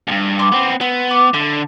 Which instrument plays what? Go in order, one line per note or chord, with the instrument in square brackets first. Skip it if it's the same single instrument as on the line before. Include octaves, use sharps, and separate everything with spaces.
[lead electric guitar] D2 G2
[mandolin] C6 D6
[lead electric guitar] B3 C4
[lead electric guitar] B3 [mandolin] C4
[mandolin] D6
[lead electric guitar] D3 [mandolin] E4